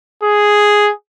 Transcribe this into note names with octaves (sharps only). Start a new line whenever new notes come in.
G#4